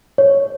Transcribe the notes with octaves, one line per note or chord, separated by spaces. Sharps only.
C#5